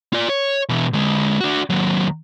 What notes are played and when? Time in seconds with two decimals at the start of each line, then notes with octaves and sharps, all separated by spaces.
0.13 F4 D5
0.29 C#5
0.69 B2 E3
0.93 D3 G#3
1.41 D4 F#4
1.70 D#2 F#3